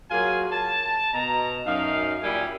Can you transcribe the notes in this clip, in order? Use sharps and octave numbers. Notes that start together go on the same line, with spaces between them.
F#3 A#3 F4 G#4 G#5
A5
B2 A#5
F#2 D#4 F5
A#2 G3 E4 G4 G#5